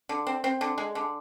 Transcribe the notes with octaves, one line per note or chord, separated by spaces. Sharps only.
D3
C4
C4
D3
G#3
D3